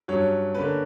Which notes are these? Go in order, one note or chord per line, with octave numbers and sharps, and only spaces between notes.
G2 F#3 C#4 C#5
D3 A#3 C#4 B4